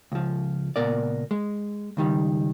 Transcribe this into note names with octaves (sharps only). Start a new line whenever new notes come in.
C#2 F3
C#2 A#2 B3 A#4 D5
G#3
C#2 D#3 G3